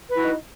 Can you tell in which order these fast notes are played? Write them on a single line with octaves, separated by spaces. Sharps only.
B4 E4 F#4 D#4